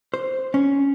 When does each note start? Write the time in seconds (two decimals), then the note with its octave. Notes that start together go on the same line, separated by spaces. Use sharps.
0.14 C5
0.54 C#4